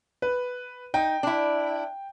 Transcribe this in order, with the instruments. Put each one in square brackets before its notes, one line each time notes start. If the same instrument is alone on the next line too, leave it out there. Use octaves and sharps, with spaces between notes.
[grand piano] B4
[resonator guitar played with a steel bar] D#4 [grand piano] G5
[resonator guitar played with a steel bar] D4 E4